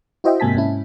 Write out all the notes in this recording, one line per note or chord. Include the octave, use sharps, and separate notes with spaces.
E4 F#4 C5 D#5 E5 G5
G#2 C3 A#3 G#5 A5 B6
G#2 C#4 E4